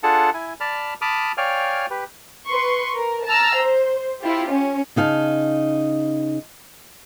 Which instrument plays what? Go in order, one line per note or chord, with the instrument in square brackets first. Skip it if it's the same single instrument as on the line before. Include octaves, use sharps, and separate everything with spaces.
[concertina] D4 F4 G#4 A4 F#5 A5
E4 G#5
D5 A5 B5 F6
A5 B5 D6 D#6 F6
C#5 D5 F5 G5 G#5 F6
G4 B4
[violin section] B4 C6 C#6
A#4
A5 A#5 E6 F6
C5
E4 F4 G4
C#4
[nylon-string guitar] C#3 D#4 F5 A5